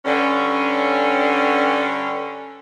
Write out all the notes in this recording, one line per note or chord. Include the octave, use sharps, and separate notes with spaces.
G2 D3 C#4